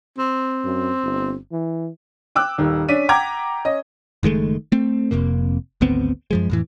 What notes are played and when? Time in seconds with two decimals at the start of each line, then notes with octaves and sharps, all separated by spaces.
0.19 C4
0.64 F#2
1.03 G1
1.52 E3
2.35 G5 D6 E6 F#6
2.58 D#1 D#3
2.89 C#4 D4 B6 D#7
3.09 F#5 G5 A#5 D6 G#6
3.65 C#4 D#5
4.23 F#1 D#3 G#3 A3
4.72 A3 C4
5.11 F1 F2 C3 A#3
5.81 G#1 D2 B3 C4
6.31 F#2 F3 G#3
6.50 F2 A2 E3